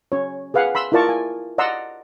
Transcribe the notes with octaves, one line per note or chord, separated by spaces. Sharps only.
C#4 C#5
G#4 B4 F5 F#5 G#5
B5 C6 E6
E4 F4 A#4 D5 A5 C#6
G#5
D5 D#5 F#5 A#5 C6 E6